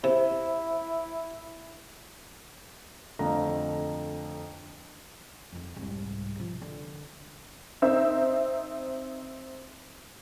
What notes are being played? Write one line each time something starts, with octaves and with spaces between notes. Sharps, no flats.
C3 E4
F2 D3 F3 A3 F5 A#5
F2 D#3
C2 G#2
C3 F3
D3
C4 D#4 E5